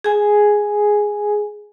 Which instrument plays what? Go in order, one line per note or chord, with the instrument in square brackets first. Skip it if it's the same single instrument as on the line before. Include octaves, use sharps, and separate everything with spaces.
[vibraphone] G#4 G#5